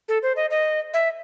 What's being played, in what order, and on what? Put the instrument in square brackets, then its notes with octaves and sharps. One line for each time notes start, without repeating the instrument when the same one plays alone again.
[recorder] A4
C5
D#5
D#5
E5